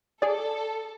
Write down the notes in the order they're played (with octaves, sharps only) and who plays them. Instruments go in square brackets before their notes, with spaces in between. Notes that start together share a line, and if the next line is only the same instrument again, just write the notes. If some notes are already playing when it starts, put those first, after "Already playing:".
[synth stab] G#4 D5 [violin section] A4